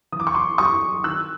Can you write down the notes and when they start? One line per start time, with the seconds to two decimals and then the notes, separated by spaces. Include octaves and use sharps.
0.12 E3 D#6
0.20 D6
0.27 C#6
0.34 C6 D6
0.58 G3 C#6 D#6
1.04 D#3 E6 F#6